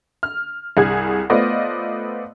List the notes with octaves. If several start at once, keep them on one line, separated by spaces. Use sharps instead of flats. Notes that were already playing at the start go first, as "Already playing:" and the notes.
F6
C2 G2 G#4 G#6
A3 B3 F4 C5 D5 D#5